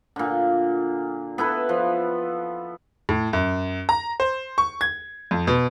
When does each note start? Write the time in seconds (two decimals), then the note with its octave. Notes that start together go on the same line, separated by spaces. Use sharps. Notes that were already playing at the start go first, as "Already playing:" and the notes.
0.16 A#2 D3
1.38 B3 E4 A4 B4
1.69 F3
3.09 A2
3.33 F#2
3.89 A#5
4.20 C5
4.58 C#6
4.81 G#6
5.31 F2
5.47 B2